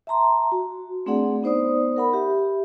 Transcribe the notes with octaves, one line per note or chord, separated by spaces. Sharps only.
E5 A5 A#5 C6
F#4
A3 C4 D4 G#4 D5 F#5
B3 D#4 C5 D5 D#6
A#4 F#5 B5
G4 E5